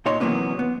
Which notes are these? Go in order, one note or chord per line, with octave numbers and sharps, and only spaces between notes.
A#2 D#4 C#5 D#5 C6
C3 E3 F#3 A#3 B3 C#4
B3